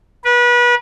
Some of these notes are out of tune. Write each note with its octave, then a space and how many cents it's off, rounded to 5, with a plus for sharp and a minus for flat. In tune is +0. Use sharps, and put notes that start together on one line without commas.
B4 -30